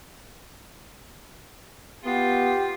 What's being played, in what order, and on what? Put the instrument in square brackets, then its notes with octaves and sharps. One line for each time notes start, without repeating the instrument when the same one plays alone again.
[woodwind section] B3 [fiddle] F4 [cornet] G4